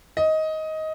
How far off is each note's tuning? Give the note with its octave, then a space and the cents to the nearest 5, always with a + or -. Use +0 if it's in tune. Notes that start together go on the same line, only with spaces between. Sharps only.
D#5 +15